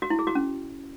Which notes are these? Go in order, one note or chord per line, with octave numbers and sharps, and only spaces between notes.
F#4
E4
G#4
F#4
C#4